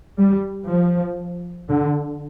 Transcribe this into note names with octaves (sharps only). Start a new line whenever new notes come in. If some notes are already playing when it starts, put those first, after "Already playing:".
G3
F3
D3